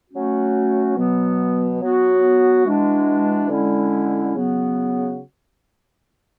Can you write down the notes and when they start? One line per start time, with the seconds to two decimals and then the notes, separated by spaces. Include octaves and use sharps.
0.11 F#3 A3 C#4 F#4
0.95 B2 F#3 B3
1.79 F#3 B3 F#4
2.64 E3 G#3 D4 F#4
3.49 D3 G#3 C#4 E4
4.33 C#3 F#3 B3 F#4